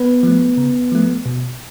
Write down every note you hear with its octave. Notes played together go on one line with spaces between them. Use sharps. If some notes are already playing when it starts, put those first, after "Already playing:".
Already playing: B3 B4
F3 A3
C#3
F3 A3
B2